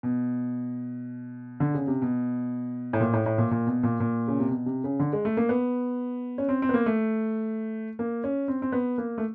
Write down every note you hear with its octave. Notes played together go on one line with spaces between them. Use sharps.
B2
D3
C#3
C3
B2
A2
A#2
A2
A2
A#2
A#2
B2
A#2
A#2
C#3
C3
B2
C3
C#3
D3
G#3
A3
A#3
B3
C#4
C4
C4
B3
A#3
A3
A#3
C#4
C4
C4
B3
A#3
A3